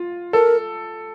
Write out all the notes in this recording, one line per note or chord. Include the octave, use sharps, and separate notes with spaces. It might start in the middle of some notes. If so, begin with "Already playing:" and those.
Already playing: F4
A4 A#4